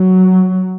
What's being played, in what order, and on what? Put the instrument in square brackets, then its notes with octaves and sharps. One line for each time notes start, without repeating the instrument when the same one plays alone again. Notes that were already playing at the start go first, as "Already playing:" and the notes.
Already playing: [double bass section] F#3